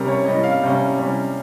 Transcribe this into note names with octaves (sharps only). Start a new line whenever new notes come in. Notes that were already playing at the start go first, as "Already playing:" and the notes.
Already playing: C3 G3 C#4 A#4
C#5
C3 G3 C#4 D#5
F5
C3 G3 C#4
C3 G3 C#4